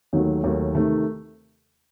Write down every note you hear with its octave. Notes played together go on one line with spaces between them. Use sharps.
D#2 D#3 F#3 A3
D#2 D#3 F#3 A3
C3 D#3 A3